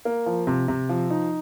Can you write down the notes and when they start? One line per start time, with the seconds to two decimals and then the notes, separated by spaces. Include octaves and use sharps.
0.05 A#3
0.26 F3
0.47 C3
0.68 C3
0.89 F3
1.10 D#4